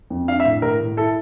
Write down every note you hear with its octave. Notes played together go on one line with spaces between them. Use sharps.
F2
D4 F5
E5
A2
A2 A#4
A2
E4 A4